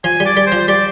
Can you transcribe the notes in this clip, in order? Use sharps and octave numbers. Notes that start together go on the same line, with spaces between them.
F3 G#5
G3
D5
G3
C5
F3
G3 D5